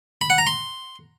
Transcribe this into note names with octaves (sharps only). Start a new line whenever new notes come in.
B5
F#5
A#5
C6